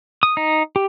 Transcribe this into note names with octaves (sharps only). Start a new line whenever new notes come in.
D#6
D#4
G4